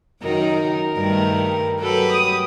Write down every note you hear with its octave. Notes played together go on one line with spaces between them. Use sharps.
F#2 D#3 D#4 A#4
G2 D#3 A3
F#3 G4 A4 B4
D#6